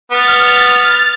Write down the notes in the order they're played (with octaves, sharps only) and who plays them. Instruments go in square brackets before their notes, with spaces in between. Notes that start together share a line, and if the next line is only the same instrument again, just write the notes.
[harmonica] B3 [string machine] F6 A6